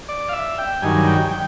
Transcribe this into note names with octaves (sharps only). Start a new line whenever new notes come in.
D5
F5
E5
G5
G2 D#3 F#3 G#5
G5
G5